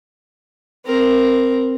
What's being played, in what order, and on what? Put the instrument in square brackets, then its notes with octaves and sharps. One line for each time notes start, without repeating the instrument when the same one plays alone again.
[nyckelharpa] C4 A#4